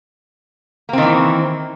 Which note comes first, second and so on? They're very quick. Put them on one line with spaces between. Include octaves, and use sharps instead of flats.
A#3 C4 D#3 E3